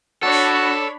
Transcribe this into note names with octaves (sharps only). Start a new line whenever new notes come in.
D4 F#4 A4 C#5 B5